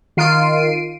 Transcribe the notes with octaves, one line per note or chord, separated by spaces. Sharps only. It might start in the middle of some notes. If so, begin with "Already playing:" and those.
D#3 F4 C7 D7 D#7